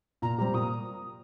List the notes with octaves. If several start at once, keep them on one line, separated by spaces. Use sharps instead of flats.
A#2 A#5
G3 C4 G4 A#5
A#2 D#6